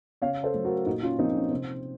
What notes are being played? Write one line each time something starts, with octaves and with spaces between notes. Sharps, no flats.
C#3 C#5 F5
A4 C5
F#3 A3
F#4 A#4
A#2 D#4 F#4
C#4 F4
F3 A#3 C4 D#4
C#4
C3 C4